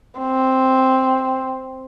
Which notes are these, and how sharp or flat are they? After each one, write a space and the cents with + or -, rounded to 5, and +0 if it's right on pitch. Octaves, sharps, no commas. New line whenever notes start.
C4 +0